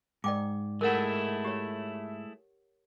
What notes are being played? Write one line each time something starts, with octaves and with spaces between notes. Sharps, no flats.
G#2 D5 G5 D6
G#3 A3 E4 A#4 F#5
G4 C#5